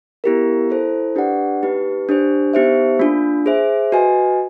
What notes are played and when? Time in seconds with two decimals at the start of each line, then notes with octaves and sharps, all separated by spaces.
0.24 B3 E4 G4 A#4
0.70 E4 A4 C5
1.16 D4 G4 B4 D5 F#5
1.63 A#3 D#4 G4 B4
2.09 D4 G4 C5
2.53 B3 D#4 G4 C5 E5
2.99 A#3 D4 F4
3.46 G#4 C5 E5
3.92 F#4 B4 D#5 G#5